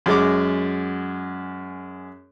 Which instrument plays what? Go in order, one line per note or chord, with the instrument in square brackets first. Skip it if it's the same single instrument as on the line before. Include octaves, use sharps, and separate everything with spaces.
[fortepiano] F#2 G#3 D6